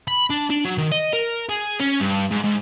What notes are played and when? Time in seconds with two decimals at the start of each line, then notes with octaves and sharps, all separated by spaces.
0.08 B5
0.30 D4
0.50 D4
0.65 F#3
0.78 D#3
0.92 D#5
1.13 A#4
1.49 G#4
1.80 C#4
2.00 G2
2.31 G#2
2.44 G#2